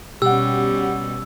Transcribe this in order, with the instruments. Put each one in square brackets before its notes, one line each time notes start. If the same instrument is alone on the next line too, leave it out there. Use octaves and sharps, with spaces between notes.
[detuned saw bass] B2 [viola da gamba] G3 C#4 [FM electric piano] G4 F#5 [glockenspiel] E6